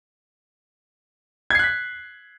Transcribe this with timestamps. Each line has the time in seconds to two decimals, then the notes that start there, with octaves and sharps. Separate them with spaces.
1.50 G#6
1.55 C7
1.59 F#6
1.64 B6